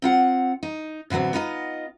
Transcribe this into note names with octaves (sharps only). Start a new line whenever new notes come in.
C4 F4 F#5
D#4
A2 D3 F#3 B3 C4
B3 D#4 F4 C#5 D#5